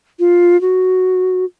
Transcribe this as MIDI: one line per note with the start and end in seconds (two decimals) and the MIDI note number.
0.19 0.60 65
0.61 1.45 66